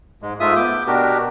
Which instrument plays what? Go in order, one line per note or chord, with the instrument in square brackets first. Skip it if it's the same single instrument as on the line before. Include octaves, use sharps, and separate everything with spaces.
[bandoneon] G#2 G#3
G#2 G#3 A3 F4 E5 D#6
B3 D6 G6
B2 D4 F#4 G4 A#4